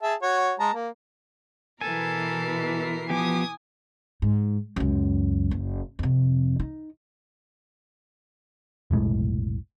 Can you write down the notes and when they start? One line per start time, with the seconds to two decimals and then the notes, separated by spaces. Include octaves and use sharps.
0.03 G#4 E5 A5
0.22 F#4 C#5
0.60 G#3 A5 A#5
0.73 A#3
1.81 B2 E3 A4 A#4 G#5 C7
3.10 F3 B3 G4 G#5 D6 D#6
4.22 G#2
4.76 C#2 F#2
5.51 F#1
5.99 F2 C3
6.60 D#4
8.91 F1 B1 A2 G#3